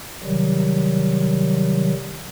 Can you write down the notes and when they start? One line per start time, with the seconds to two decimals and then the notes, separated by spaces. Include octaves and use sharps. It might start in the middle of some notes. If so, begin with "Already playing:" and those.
0.24 C3 D#3 F#3 G3